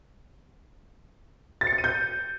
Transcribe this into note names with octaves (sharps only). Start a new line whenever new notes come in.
A6
C#7
A6
D#7
G6